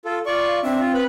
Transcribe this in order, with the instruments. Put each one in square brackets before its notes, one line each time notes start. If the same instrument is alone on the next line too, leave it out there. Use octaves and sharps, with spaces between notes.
[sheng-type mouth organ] F4 A4
[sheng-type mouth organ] F4 D5 C#6 [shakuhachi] F5
[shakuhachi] C4 [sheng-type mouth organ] D4 E5
[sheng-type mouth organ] F4
B4 B5